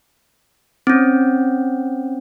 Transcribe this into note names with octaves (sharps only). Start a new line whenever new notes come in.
C4 C#4